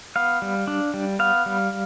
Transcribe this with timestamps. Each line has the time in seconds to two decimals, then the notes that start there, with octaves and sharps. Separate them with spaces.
0.16 B3 F5
0.42 G3
0.67 D4
0.94 G3
1.19 B3 F5
1.46 G3